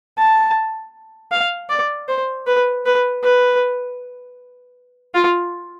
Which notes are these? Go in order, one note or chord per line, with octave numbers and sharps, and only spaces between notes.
A5
F5
D5
C5
B4
B4
B4
F4